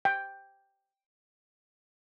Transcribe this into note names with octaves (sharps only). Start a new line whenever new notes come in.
G5